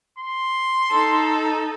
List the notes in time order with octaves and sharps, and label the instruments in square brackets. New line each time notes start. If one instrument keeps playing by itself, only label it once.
[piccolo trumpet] C6
[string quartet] D#4 A4